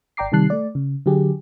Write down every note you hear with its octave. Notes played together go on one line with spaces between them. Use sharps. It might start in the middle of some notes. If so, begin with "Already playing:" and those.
G#1 D5 G5 A#5 D6 C7
C3 D#3 G3 A5 F#6 C7
A3 D5
C#3
D3 F#3 G4 G#4